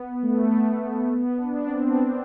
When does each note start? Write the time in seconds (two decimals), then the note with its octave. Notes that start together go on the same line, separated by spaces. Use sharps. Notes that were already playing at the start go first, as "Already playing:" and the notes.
Already playing: B3
0.23 A3
1.10 B3
1.38 D4
1.67 C4
1.96 D4